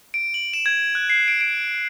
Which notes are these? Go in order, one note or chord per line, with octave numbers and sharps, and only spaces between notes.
D7
F#7
E7
G#6
F#6
C7
D7
D7